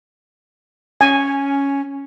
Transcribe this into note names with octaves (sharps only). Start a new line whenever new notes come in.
C#4 G#5